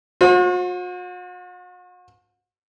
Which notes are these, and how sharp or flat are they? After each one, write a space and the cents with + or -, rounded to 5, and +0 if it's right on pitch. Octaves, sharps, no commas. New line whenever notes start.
F#4 -45 C5 +35